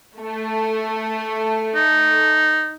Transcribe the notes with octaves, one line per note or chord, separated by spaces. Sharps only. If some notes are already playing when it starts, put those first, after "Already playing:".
A3
D#4